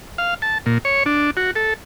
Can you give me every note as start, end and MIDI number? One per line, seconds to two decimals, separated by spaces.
0.18 0.34 77
0.42 0.58 81
0.66 0.78 46
0.85 1.03 73
1.06 1.31 62
1.37 1.51 66
1.56 1.74 69